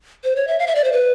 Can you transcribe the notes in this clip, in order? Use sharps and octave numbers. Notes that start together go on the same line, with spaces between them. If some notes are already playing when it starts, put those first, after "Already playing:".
C5
C#5
E5
F5
E5
D5
C5
B4